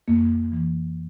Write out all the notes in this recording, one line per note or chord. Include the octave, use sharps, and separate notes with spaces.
F2 A#3
E3